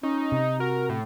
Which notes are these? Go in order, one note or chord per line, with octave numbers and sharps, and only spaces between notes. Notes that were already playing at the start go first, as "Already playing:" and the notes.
C#4 D#4
C3
F#4 A#4
A2